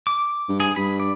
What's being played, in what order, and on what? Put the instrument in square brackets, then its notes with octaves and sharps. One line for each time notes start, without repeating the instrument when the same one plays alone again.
[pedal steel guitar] D6
[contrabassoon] G2
[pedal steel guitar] G#4
[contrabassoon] G2 [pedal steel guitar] B5
[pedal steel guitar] D5